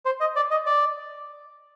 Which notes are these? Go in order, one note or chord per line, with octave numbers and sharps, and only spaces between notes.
C5
D#5
D5
D#5
D5